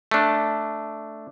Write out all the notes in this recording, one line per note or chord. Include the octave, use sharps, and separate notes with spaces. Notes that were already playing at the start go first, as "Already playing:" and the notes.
A3 D4